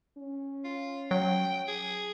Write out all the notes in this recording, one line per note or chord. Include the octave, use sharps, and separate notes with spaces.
C#4
F4
F#3 G5
G#4